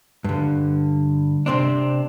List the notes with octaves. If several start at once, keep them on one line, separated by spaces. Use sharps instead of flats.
G2 D3
C3 C4 D4